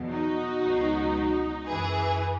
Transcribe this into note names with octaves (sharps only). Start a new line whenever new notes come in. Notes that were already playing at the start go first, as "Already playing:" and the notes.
Already playing: E2 B2 F#3
D#4 F#4
C#2 B2 F#3
F#2 E3 G#4 B4